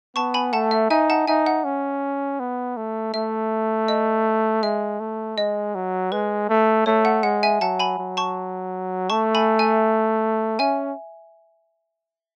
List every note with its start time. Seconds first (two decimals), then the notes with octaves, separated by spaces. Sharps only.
0.16 B3 A5 C#6
0.34 G#5 B5
0.53 A3 F#5 A5
0.71 E5
0.90 D#4 E5 G#5
1.10 F#5 A5
1.27 D#4 E5 G#5
1.46 F#5
1.65 C#4
2.40 B3
2.77 A3
3.14 A3 E5
3.88 D#5
4.63 G#3 E5
5.00 A3
5.37 G#3 D#5
5.75 F#3
6.12 G#3 B4
6.49 A3
6.86 A3 C#5
7.05 F#5
7.23 G#3 F#5
7.43 E5 G#5
7.61 F#3 F#5 A5
7.79 G#5 B5
7.99 F#3
8.17 A5 C#6
9.10 A3 A5 C#6
9.35 G#5 B5
9.59 E5 G#5
10.59 C#4 E5 G#5